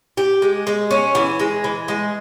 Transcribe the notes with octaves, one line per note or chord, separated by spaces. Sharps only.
G4
G#3
G#3
C#4
E3
G#3
E3
G#3